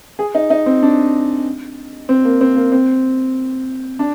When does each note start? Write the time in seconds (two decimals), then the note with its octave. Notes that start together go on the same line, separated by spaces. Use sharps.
0.19 G#4
0.35 D#4
0.50 D#4
0.66 C4
0.83 D4
2.09 C4
2.25 A#3
2.41 C4
2.56 A#3
2.72 C4
3.99 D4